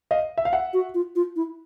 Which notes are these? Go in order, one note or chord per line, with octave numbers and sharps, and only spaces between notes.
D#5 F5
E5
F5
E5 F#5
F#4
F4
F4
E4